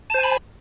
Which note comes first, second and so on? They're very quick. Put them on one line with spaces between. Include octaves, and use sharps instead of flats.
A5 C5 G#5 B5